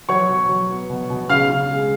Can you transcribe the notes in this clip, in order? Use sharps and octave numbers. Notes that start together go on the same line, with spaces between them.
F#3 C#5 C#6
B2
F#3
B3
B2
B2
C#3 F5 F6
C#3
G#3